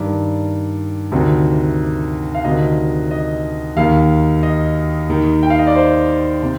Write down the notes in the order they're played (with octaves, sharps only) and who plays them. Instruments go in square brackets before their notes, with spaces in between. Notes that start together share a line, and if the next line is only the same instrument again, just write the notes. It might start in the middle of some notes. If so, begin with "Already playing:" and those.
Already playing: [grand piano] G2 D#3 D5
D2 C3 D#3
F5
D2 C3 D#3 D#5
D#5
D#2 D#3 F5
D#5
D#2 D#3
G5
F5
D#5
D5
C5
C3